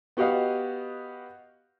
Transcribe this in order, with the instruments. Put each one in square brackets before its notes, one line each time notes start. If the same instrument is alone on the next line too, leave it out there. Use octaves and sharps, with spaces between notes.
[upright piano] B3 F#4 G4 D#5 F5